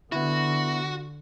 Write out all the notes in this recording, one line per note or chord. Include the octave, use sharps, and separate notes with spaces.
D3 B3 E4 F#4